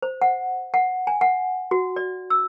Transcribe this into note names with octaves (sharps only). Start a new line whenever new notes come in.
C5
F#5
F#5
G#5
F#5
F#4
D5
E6